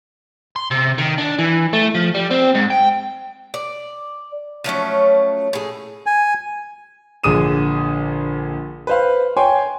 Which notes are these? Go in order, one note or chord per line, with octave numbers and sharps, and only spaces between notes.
C6
C3
D#3
D4
E3
A3
F3
G3
C4
G#2
G5
D5
F3 F#3 A3 C#4
A2 G#4
G#5
A#1 D3 G#4 D#6 D#7 E7
B4 C5 F5
C#5 G5 G#5 C6